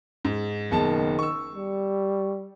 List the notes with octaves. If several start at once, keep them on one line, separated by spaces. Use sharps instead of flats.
G#2
F#1 B2 D#3 A5
C#6 E6
G3